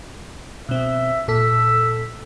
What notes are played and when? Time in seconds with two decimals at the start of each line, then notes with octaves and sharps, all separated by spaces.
0.69 B2 C4 E5
1.28 A#2 A4 E6 B6